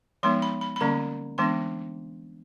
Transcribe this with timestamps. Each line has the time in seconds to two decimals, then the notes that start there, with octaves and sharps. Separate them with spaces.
0.23 F3 G#3 B3 D#4 C6
0.42 B5
0.61 B5
0.76 B5
0.81 D3 G3 A#3 C#4 A#5
1.38 E3 G#3 B3 D4 C6